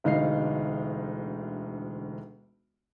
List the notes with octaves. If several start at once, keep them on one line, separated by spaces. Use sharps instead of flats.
E1 D2 D#4 F5 C7